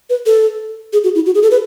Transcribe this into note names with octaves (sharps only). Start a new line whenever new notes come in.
B4
A4
G#4
F#4
E4
F#4
G#4
A4
B4